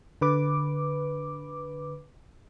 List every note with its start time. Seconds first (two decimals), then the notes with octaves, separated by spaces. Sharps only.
0.21 D3 B4 D6